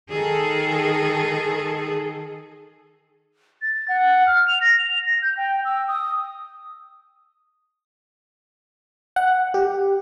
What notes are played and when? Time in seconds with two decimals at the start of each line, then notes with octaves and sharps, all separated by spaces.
0.12 D#3 G#4 A4
3.62 A6
3.88 F#5
4.26 F6
4.48 F7
4.61 A#6
4.78 F7
5.06 A#6
5.22 G6
5.37 G5
5.65 E6
5.88 D#6
9.16 F#5
9.54 G4